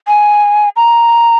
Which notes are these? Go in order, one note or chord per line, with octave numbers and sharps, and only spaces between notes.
G#5
A#5